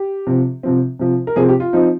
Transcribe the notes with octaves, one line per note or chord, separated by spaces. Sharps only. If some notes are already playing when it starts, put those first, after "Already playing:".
Already playing: G4
C3 F3 C4
C3 F3 C4
C3 F3 C4
A#4
C3 F3 C4 G#4
G4
F4
F3 C4 D#4